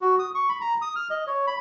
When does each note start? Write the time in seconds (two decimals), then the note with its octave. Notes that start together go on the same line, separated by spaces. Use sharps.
0.01 F#4
0.19 D#6
0.35 C#6
0.49 B5
0.61 A#5
0.82 D#6
0.96 F6
1.10 D#5
1.27 C#5
1.47 B5